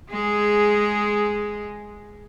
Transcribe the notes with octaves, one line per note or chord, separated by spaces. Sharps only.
G#3 G#4